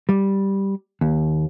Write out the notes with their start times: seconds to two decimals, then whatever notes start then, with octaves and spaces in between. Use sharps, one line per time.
0.09 G3
1.01 D#2